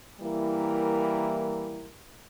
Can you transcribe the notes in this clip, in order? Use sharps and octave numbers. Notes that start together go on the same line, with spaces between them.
E3 G3 A#3 E4 A#4